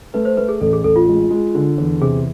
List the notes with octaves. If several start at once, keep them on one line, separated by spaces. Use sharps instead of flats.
A3 B4
C5
A3 B4
G#4
A1 A4
G#4
A1 A4
F4
G#3
G#3
D3
E2
C3 G#4